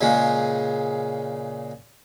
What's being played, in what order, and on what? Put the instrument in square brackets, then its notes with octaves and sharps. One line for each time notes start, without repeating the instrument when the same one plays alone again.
[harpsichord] A#2 C#3 G#3